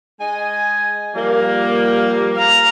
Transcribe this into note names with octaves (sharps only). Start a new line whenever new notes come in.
G#3 D#5 G#5
F3 G3 A#3
F5 A#5